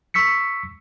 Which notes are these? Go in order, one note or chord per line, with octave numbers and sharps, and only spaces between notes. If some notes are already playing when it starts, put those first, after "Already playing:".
C#6 E6 B6 C#7